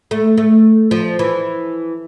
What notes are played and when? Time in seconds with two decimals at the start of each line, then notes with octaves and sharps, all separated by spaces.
0.11 A3
0.38 A3
0.91 F3
1.19 E3